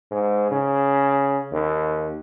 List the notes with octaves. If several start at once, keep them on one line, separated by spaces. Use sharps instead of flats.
G#2
C#3
D#2